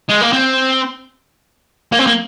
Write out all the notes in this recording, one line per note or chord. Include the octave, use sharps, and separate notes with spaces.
G#3
A#3
C4
A#3
C4
A#3